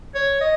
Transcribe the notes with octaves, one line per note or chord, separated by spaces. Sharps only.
C#5
D#5